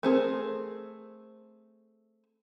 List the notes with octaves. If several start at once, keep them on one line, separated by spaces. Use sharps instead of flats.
A3 C4 G#4 A#4